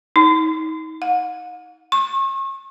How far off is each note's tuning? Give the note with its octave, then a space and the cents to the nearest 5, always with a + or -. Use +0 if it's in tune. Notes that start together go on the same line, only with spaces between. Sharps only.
D#4 +35
F#5 -45
C#6 -40